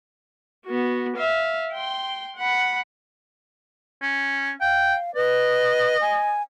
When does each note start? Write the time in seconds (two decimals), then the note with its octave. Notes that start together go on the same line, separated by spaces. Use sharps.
0.66 B3 F#4
1.17 E5 F5
1.73 G5 C6
2.37 F#5 B5
4.02 C#4
4.61 F5 G5
5.15 B4 D#5
6.01 G#5